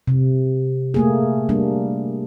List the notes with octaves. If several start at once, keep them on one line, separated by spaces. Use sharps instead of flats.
C3
A3 A#3 G#4
G3 A#3 D4